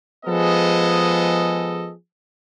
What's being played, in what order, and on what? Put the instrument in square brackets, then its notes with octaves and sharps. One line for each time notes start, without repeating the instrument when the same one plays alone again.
[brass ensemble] F3 G#3 B3 G#4 A4 D#5